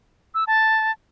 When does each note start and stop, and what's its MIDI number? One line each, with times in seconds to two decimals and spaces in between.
0.35 0.44 88
0.47 0.91 81